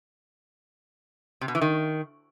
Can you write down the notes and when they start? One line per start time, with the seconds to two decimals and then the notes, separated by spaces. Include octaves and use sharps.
1.41 C3
1.48 B2
1.55 E3
1.61 D#3